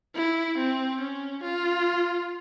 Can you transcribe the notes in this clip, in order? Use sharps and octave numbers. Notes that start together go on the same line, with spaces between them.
E4
C4
C#4
F4